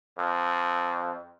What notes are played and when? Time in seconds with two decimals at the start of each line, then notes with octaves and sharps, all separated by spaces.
0.18 F2